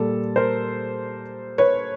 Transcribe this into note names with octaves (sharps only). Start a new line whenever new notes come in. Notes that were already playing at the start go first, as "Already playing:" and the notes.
Already playing: A#2 G3 A4
A#4 C5
B4 C#5